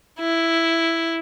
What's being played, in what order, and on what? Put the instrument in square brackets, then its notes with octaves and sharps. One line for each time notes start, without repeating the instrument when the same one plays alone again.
[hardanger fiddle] E4